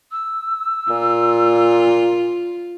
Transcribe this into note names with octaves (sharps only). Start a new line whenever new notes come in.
E6
A#2 F4